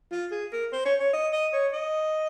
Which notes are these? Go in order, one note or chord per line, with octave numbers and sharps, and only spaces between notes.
F4
G#4
A#4
C5
C#5
C#5
D#5
D#5
C#5
D#5